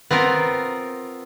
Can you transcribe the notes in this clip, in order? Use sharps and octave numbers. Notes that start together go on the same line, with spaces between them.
B3 C4 F4 A#4